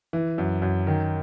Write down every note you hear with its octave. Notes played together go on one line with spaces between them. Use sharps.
E3
F#2
F#2
D#3